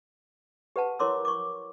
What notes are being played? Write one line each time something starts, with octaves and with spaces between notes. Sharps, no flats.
G4 B4 F#5 A5
E4 A#4 C#5 C6 D6 E6
C#6 D6